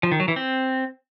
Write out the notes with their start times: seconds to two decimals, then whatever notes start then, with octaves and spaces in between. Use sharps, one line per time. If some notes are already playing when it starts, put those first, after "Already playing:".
0.03 F3
0.12 D#3
0.20 F#3
0.28 E3
0.36 C4